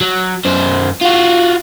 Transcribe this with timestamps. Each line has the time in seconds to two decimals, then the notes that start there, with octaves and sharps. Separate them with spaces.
0.01 F#3
0.45 F#2 C5
1.01 F4 F#4